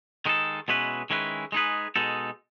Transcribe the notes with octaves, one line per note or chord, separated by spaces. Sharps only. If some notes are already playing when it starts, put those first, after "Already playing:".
D#3 G#3 D#4 A4
B2 G#3 C#4 E4 B4
D#3 G#3 C#4 E4 B4
G#3 D#4 G#4 B4
B2 G#3 D#4 A4